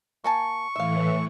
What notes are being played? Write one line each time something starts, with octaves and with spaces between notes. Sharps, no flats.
A#3 G#5 A5 C#6
A2 E3 E5 F5